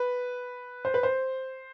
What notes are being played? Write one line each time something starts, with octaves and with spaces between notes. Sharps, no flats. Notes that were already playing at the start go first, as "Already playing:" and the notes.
Already playing: B4
C5
B4
C5